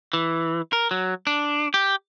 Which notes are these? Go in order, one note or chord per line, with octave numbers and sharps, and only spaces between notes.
E3
A#4
F#3
D4
G4